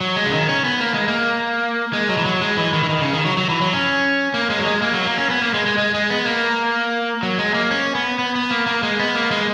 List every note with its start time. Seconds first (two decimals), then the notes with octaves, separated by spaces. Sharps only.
0.01 F#3
0.16 G#3
0.26 C#3
0.32 D#3
0.49 C#4
0.64 B3
0.80 A#3
0.94 G#3
1.08 A#3
1.93 G#3
2.09 F#3
2.18 E3
2.25 F#3
2.41 G#3
2.57 E3
2.73 D#3
2.83 E3
2.89 D#3
3.01 C#3
3.13 D#3
3.25 F#3
3.37 F#3
3.50 E3
3.62 F#3
3.73 C#4
4.34 A#3
4.50 G#3
4.59 F#3
4.66 G#3
4.82 A#3
4.94 F#3
5.05 A#3
5.18 C#4
5.30 B3
5.42 A#3
5.54 G#3
5.66 G#3
5.78 G#3
5.94 G#3
6.10 B3
6.26 A#3
7.23 F#3
7.39 G#3
7.54 A#3
7.71 C#4
7.95 B3
8.19 B3
8.35 B3
8.51 A#3
8.66 A#3
8.83 G#3
8.99 B3
9.15 A#3
9.31 G#3